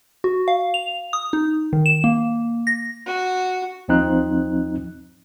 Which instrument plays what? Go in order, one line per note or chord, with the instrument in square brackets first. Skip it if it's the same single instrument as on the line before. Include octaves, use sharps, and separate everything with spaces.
[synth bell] F#4
F5
F7
D#6
D#4
D#3
E7
A#3
A#6
[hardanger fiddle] F#4
[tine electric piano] D#2 F3 C4 D#4 F#6